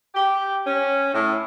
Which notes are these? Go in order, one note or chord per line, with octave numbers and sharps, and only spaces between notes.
G4
C#4
A2